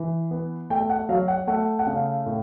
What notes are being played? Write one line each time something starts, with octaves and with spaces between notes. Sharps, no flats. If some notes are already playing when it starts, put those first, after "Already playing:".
Already playing: E3
B3
A3 G5
F#5
F#3 F5
F#5
A3 F#5
F#5
C#3 F5
A2